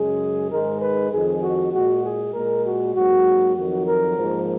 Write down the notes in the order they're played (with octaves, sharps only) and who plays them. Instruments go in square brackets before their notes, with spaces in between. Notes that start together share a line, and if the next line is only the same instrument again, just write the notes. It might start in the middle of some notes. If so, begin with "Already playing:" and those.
Already playing: [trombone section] F#2 C#3 G#3 G#4
G#2 D#3 G#3 A#4
B4
F2 D#3 G#3 G#4
F#4
A#2 G#3 F#4
G#4
A#2 G#3 A#4
F#4
G#2 F#3 A#3 F#4
F2 D#3 F#3 F#4
A#4
G#2 F3 A#3